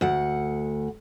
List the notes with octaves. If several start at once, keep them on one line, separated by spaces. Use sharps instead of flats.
D2 F#5